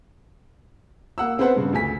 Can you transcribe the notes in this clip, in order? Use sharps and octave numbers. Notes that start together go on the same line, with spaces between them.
A#3 F#5 E6
B3 C4 G#4 B4 C5 F#5
G2 C#3
D2 G#4 G#5 B6